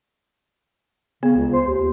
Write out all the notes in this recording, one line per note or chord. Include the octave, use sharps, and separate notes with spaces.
C#3 B3
C#2
C5
D#2